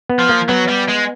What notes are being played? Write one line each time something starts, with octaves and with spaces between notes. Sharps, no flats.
B3
F3
A#3
F#3 B3
G3
G#3